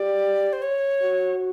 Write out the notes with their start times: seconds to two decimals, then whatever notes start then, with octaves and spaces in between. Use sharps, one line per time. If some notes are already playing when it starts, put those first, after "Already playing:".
Already playing: G4 D5
0.53 C5
0.62 C#5
1.02 F#4